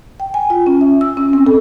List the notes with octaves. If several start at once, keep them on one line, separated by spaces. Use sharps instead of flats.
G5
G#5
F4
C#4
E5
E6
C#4
C4
A4